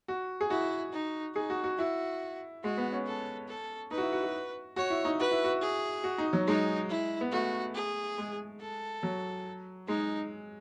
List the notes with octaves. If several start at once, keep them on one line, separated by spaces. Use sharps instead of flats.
F#4
G#4
E4 F#4
D#4
D#4 G#4
F#4
F#4
E4 F#4
G#3 F#4
B3
C#4
A4
A4
D#4 B4
F#4
E4
F#4
F#4
F#4 C#5
E4
D#4
F#4 B4
E4
F#4
G#4
F#4
D#4
F#3
G#3 D#4
E4
B3
A3 F#4
G#4
G#3
A4
F#3
G#3 D#4